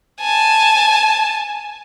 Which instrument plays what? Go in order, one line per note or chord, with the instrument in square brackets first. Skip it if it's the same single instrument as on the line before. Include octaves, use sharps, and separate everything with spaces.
[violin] G#5 A5